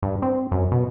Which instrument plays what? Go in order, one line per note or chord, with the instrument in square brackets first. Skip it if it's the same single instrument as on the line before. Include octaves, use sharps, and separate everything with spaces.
[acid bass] G2
C4
F#2
B2